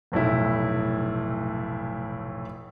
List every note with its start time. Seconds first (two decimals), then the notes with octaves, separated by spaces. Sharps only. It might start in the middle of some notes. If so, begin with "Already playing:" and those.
0.12 F1 B1 A2 E4